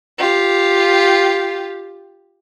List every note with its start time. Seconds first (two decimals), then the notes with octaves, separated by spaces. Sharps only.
0.19 F4 G4